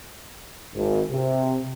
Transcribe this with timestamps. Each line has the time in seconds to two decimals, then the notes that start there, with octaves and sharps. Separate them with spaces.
0.74 G#1
1.10 C3